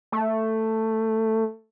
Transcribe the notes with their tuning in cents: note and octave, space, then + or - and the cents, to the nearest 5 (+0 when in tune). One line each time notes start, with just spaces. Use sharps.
A3 +10